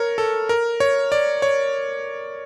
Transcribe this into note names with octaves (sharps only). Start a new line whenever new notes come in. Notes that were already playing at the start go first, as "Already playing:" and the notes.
Already playing: A#4 C#5
A4
A#4
C#5
D5
C#5